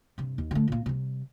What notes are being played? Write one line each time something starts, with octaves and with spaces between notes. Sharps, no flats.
G2 C3
D#2
D3 A3
A#2 A#3
C3 G3